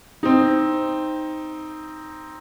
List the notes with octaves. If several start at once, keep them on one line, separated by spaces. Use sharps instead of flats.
C4 D#4